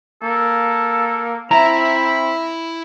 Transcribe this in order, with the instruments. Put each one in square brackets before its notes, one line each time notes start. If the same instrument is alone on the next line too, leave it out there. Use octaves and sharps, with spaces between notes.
[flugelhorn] A#3 [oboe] A4
[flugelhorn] C4 [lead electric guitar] E4 E5 [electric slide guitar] A#5 [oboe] B5